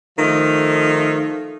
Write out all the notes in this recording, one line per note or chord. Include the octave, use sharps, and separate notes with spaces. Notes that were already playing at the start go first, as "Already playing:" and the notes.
D#3 F3 A3